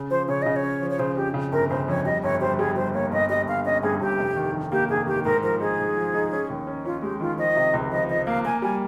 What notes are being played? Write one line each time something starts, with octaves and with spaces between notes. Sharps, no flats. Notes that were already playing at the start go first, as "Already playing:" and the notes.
Already playing: C#3
F3 C5
C#3 C#5
C#3 D#5
C#5
C#4
F3
C#5
C#3 C5
F2 G4
C#3
G1 A#4
C#3 C5
F2 C#5
G3 D#5
G1 C#5
G3 C5
G3 G#4
G3 C5
A#3 C#5
G1 D#5
G3 D#5
G1 F5
C#4 D#5
G2 G#4
G1 G4
F1
D#3
D#3
A#3 G4
F1 G#4
D#3 G4
G#2 A#4
F3 A#4
D#4 G#4
G#2
F3
D#4
C#4
D#2
C#4
C#4 F4
G#3 G4
D#3 F4
F3 D#5
C3
C#2
F3 D#5
F3 D#5
A#3 F5
A#3 G#5
G3 G#5